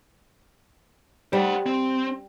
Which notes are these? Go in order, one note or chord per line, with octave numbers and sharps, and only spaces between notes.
G3 C5 F#5
C4